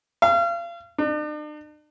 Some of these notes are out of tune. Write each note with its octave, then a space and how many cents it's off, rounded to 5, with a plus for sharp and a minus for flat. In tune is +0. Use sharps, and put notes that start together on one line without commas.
F5 -35
D4 +45